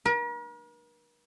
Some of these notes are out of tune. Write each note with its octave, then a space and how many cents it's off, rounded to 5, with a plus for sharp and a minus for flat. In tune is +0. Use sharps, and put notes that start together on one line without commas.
A#4 +45